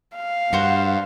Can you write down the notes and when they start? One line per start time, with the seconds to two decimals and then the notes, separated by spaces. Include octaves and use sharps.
0.16 F5
0.53 G2 F#4 C5 F#5